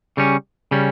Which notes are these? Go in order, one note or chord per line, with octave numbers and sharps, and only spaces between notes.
C#3 G3 C#4
C#3 G3 C#4